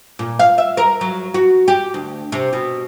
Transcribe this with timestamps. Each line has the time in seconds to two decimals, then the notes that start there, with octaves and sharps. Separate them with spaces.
0.19 A#2
0.39 F5
0.58 E5
0.77 A#4
1.01 F#3
1.34 F#4
1.68 G4
1.94 D2
2.32 C3
2.53 B2